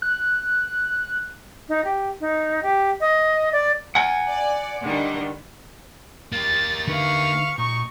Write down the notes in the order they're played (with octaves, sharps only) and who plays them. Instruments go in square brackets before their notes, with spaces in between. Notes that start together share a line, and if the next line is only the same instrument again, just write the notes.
[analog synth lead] F#6
[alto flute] D#4
G4
D#4
G4
D#5
D5
[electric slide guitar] F#5 G#5
[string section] D5
D3 D#3 G3
[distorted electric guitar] A#3 G4 [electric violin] A6
[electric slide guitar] D3 D#4 E5 [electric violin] B4 F5 [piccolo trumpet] C#6
[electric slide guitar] A#2 [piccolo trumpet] D#4 [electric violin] C#6